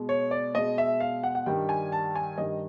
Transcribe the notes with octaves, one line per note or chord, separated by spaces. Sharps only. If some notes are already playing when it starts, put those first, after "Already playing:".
Already playing: B2 G#3
C#5
D5
B2 G#3 D#5
E5
F5
F#5
F#5
G2 D#3 G3 G5
G#5
A5
G#5
G2 D#3 G3 D#5